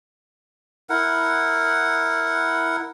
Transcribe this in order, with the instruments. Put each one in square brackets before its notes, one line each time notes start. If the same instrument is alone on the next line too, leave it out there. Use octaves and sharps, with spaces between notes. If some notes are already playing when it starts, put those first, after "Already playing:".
[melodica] E4 A#4 F#5